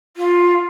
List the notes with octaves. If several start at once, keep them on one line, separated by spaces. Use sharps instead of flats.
F4